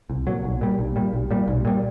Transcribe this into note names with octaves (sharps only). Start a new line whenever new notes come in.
C2
A#2 F#3
B1
A#2 G3
B1
A#2 G3
B1
A#2 G3
B1
A#2 G3